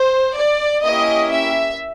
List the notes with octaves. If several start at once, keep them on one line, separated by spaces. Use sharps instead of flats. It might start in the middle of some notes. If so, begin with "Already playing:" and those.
Already playing: C5
D5
A#3 C#4 E4 G4 D#5
E5